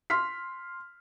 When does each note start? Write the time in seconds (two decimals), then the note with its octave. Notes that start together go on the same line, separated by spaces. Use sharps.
0.10 C6 F6 B6